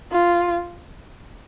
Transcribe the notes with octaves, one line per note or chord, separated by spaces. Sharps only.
F4